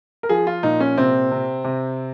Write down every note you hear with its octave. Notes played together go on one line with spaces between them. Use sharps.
A#4
F3 G#4
F4
A#2 D#4
C#4
C3 C4
C3
C3